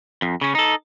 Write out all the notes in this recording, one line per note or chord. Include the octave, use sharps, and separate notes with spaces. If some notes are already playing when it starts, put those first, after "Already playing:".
F2
C#3 C#4
D#4 A4